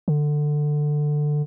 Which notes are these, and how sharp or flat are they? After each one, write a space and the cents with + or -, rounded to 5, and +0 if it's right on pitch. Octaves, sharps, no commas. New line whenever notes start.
D3 +15